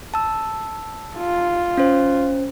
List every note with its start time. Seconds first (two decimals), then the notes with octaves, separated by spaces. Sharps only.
0.14 A5 E6
1.17 F4
1.78 C#4 C5